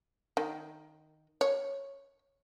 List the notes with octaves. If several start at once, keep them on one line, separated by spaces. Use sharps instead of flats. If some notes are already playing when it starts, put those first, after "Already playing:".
D#3
C#5